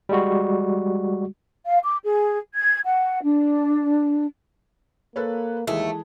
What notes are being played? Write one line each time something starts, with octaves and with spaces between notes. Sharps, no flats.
G3 G#3 F#4
F5
D6
G#4
G#6
F#5
D4
A#3 A4 B4 C#5
D#2 E3 G#3 A3